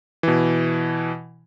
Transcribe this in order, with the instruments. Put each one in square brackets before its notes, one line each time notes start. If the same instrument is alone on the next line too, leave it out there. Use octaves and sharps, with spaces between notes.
[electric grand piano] B2 E3